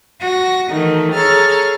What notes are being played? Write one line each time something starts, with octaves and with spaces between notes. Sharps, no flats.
F#4 A#6
D#3 E3 A3 D#4
G#4 A4 C#5 A#5 F6